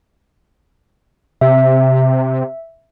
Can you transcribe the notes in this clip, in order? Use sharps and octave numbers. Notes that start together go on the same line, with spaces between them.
C3 E5